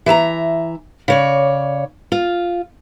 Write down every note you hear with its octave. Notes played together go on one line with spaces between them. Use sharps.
E3 E5 A5 A#5
C#3 C#5 D5
F4